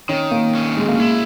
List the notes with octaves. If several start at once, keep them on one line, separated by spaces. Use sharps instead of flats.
D#3 C#4
A#3
C#4
G#3
A#3
G#3 E4